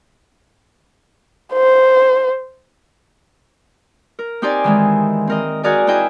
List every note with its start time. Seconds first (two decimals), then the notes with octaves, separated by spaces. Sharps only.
1.54 C5
4.19 A#4
4.42 C4 D#4 G4 C5 D5 G#5
4.64 D#3 E3 G#3
5.27 C4 A#4 D#5
5.63 F#4 G#4 A#4 D5 G#5
5.87 C4 E4 C5 D#5 G5 G#5